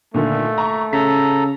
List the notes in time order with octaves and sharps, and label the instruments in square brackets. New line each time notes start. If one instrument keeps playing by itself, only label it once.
[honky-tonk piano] A#2 D3 D#3 [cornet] A3
[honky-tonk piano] A#5 C#6
[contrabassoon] C#3 [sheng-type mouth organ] A4 A#5 [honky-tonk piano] B6